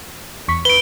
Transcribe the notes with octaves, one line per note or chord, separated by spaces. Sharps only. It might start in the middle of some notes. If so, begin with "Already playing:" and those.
E2 C#6 B6
B4 D7 G7